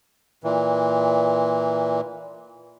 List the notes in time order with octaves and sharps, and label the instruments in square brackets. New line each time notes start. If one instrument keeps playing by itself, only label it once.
[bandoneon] A#2 E3